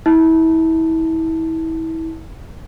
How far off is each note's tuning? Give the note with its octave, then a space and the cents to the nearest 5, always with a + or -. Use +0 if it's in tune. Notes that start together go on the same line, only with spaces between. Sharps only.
E4 -30 A5 +0